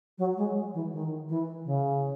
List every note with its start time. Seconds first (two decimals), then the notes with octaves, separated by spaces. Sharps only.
0.18 F#3
0.37 G#3
0.74 E3
0.92 D#3
1.29 E3
1.65 C#3